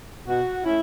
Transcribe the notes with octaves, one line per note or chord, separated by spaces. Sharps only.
B2 F#4
A3 C#4 E4